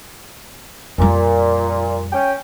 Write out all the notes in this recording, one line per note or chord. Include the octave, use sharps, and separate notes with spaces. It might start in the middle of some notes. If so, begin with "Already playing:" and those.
F2 A#2 G3
C#4 G5